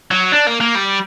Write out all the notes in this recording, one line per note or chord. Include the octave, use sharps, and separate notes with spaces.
F#3
D4
A#3
A#3
G3